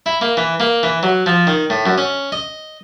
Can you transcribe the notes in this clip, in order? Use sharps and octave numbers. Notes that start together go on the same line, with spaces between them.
E4
A#3
E3
A#3
E3
F#3
F3
D#3
A2
F#2
C#4
D#5